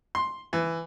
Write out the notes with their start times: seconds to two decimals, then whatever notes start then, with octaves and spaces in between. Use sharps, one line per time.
0.15 C6
0.53 E3